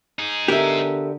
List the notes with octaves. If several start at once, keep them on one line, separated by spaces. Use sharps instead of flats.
D#4 G#4
D3 B3 G4 A#4 E5